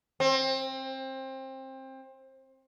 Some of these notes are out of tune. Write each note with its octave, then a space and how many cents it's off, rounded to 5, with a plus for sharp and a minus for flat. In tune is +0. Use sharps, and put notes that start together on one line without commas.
C4 +25